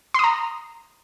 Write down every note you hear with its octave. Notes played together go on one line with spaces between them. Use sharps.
A#5 C6 D#6